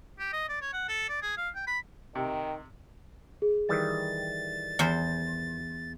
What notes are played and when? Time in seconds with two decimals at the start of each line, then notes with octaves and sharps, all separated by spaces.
0.19 G4
0.33 D#5
0.49 D5
0.62 C#5
0.73 F#5
0.89 A4
1.09 D5
1.22 G#4
1.37 F5
1.55 G5
1.67 B5
2.15 C3 D#3 G5
3.42 G#4
3.69 D#3 E3 G3 A6
4.79 E2 C5